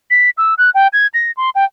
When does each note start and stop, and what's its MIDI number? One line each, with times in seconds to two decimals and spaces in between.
0.10 0.30 95
0.38 0.54 88
0.58 0.70 90
0.75 0.88 79
0.93 1.07 92
1.14 1.31 94
1.37 1.50 84
1.55 1.65 79